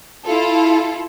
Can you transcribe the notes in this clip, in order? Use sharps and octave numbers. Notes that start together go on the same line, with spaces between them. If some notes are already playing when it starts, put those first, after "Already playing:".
E4 F4 A4